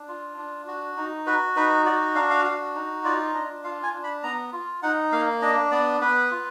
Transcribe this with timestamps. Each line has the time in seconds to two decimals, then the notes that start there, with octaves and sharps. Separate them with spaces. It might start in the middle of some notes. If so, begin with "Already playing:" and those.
Already playing: D4
0.08 F4
0.38 D4
0.67 F#4
0.97 D#4
1.26 F#4 B4
1.56 D#4 B4
1.86 F#4 D5
2.15 D4 F5
2.30 F5
2.45 F#4
2.75 D#4
3.04 F4 D5
3.34 D4 D#5
3.64 F4 F5
3.83 G#5
3.93 D4
4.04 B5
4.23 B3 A#5
4.53 F4
4.82 D#4 F#5
5.12 A#3 F5
5.42 D4 D#5
5.71 B3 D5
6.01 B3 B4
6.31 F4